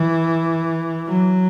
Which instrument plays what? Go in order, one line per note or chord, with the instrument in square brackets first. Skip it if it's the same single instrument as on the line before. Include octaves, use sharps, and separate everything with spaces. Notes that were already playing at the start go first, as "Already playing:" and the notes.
Already playing: [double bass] E3
F#3